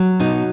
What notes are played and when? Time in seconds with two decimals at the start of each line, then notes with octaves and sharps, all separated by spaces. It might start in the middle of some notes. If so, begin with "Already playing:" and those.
Already playing: F#3
0.20 B2 D#4